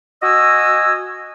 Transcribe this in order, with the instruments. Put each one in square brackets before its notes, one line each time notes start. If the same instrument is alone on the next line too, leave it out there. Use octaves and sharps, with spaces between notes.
[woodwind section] F#4 D#5 G#5 E6